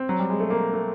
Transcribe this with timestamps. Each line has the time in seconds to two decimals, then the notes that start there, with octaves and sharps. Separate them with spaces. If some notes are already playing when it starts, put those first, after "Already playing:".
Already playing: C4
0.09 F#3
0.19 G3
0.30 G#3
0.40 A3
0.50 A#3
0.73 A3